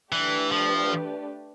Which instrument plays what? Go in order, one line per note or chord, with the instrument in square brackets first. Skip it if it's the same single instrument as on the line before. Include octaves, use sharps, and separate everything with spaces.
[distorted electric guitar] E3 [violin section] A3 D4 G4 B4 D5
[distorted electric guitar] F3